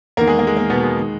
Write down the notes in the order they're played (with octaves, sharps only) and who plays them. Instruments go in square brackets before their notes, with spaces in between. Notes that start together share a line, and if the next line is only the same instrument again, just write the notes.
[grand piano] E2 D#3 A#3 A#4
G#3 G#4
A#3
G#3
A#3
B2 B3
G#3
D#3